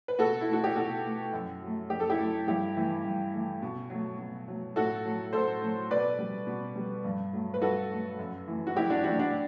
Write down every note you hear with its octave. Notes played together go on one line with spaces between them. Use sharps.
B4
B2 F#4 A4
E4
A3 F#4
G4
B2 F#4 A4
A3
F#2
F#3 A3
F#2 G4
A4
E4 G4
F#3 A3
G2 E4 G4
E3 A3
G2
E3 A3
B2
F#3 A3
B2
F#3 A3
A2 F#4 A4
F#3 A3
A2 A4 C5
F#3 A3
B2 B4 D5
G3
B2
G3
G2
F#3 A3
B4
G2 F#4 A4
F#3 A3
F#2
E3 A3
F#4
F#2 E4 G4
D4 F#4
E3 A3 D4 F#4
D4 F#4